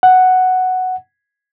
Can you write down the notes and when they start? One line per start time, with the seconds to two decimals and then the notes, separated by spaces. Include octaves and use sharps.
0.03 F#5